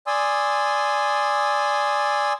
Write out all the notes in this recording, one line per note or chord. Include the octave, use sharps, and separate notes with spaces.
D5 G#5 C6 D#6 E6